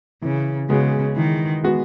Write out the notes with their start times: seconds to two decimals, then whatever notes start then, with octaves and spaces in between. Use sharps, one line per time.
0.22 C#3 E3
0.70 C#3 G#3 B3 F#4
1.16 D#3 E3
1.63 G#3 B3 F#4